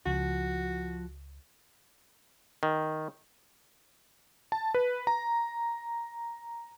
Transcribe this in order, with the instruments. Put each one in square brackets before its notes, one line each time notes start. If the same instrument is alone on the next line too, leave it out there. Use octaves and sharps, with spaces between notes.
[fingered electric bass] C#2 [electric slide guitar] F3 [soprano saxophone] F#4
[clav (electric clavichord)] D#3
[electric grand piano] A5
B4
A#5